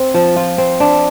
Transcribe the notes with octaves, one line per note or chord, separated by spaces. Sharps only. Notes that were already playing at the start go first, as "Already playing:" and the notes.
Already playing: C4
F3
F4
C4
D4